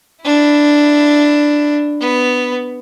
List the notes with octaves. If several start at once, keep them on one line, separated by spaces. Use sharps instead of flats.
D4 E4
B3